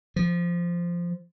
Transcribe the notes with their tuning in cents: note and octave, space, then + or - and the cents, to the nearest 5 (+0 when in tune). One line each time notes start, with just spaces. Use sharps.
F3 -10